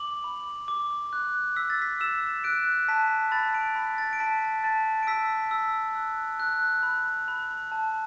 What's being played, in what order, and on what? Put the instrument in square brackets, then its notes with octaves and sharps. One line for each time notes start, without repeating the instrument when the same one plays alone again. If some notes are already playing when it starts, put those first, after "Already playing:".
Already playing: [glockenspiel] D6 F#7
B5
D6
F#6
E6 B6
A6
B6
E6 E7
F#6 D7
A5 B6
B5 A6
D7
B5 B6
A6
D7
A5 B6
A5 A6
D7
E6 B6
E6
F#6
F#6
B5
B5
A5